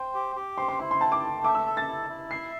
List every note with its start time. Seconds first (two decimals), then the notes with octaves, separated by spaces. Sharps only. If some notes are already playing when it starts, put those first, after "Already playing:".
Already playing: C5 G5
0.14 G4
0.36 G4
0.58 C5 C6
0.68 C6
0.79 E4 C6
0.91 C6
1.01 G5 A5
1.12 D6
1.23 A3
1.44 E5 D6
1.55 E6
1.66 A4
1.77 A6
1.88 E4
2.10 E4
2.31 E5 C7